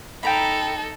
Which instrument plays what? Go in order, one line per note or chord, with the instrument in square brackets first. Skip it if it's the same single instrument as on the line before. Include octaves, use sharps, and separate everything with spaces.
[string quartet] D#4 A4 [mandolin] G5 A#5 B5